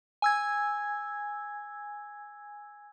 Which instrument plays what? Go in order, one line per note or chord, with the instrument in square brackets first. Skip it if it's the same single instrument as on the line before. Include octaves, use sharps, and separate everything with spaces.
[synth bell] G#5 E6 G#6